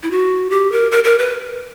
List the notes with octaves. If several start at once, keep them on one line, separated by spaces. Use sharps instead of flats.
E4
F#4
G4
A#4
A#4
A#4
B4